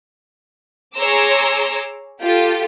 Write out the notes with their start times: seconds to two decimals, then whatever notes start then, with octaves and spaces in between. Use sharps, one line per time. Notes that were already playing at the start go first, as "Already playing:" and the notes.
0.96 G#4 C#5 A#5 C6 D6 E6
2.21 F4 G4 A4